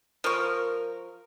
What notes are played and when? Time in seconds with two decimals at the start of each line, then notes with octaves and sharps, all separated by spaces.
0.24 F3 A#4 C#6